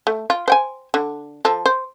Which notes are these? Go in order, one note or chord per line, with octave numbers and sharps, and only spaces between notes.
A3
F4
C5 G5 G#5
D3
F3 A4
C5